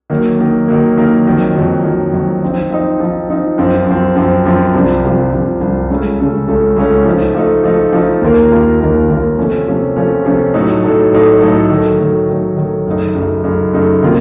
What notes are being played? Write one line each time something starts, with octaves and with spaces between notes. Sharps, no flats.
D#3 F#3 A#3
D#3 F#3 A#3
D#3 F#3 A#3
D#3 F#3 A#3
F2 D#3 F#3
F2 D#3 F#3
F2 D#3 F#3
F2 D#3 F#3
F3 C4 D#4
F3 C4 D#4
F3 C4 D#4
F3 C4 D#4
F#2 F3 C4
F#2 F3 C4
F#2 F3 C4
F#2 F3 C4
C2 C3 F3
C2 C3 F3
C2 C3 F3
C2 C3 F3
C#2 C#3 A3 C#4 A4
C#2 C#3 A3 C#4 A4
C#2 C#3 A3 C#4 A4
C#2 C#3 A3 C#4 A4
F3 A3 D#4
F3 A3 D#4
F3 A3 D#4
F3 A3 D#4
D#2 D#3 A#3 F4 A#4
D#2 D#3 A#3 F4 A#4
D#2 D#3 A#3 F4 A#4
D#2 D#3 A#3 F4 A#4
C3 F3 A3 C#4
C3 F3 A3 C#4
C3 F3 A3 C#4
C3 F3 A3 C#4
A2 F#3 A3 D#4 A4
A2 F#3 A3 D#4 A4
A2 F#3 A3 D#4 A4
A2 F#3 A3 D#4 A4
D#3 F#3 A3
D#3 F#3 A3
D#3 F#3 A3
D#3 F#3 A3
F#2 C#3 A3 D#4
F#2 C#3 A3 D#4
F#2 C#3 A3 D#4
F#2 C#3 A3 D#4
C3 D#3 A#3 F4